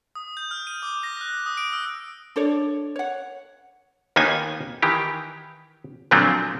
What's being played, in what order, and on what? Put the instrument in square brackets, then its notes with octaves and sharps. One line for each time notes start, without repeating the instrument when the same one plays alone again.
[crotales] D#6
G6
F6
D#7
D6
A#6
F#6
D#6
D7
E6
[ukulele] D4 A4 C#5 D5
C#5 F#5
[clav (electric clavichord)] D#2 D#3 A#3 B3 D#4 G#5
D#3 E3 G4
A#2 D3 F3 F#3 A3 C4